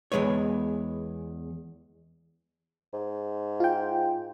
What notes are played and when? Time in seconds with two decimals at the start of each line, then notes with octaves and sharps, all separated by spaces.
0.12 E2 D#3 G#3 B4 C#5
2.93 G#2
3.60 F4 G5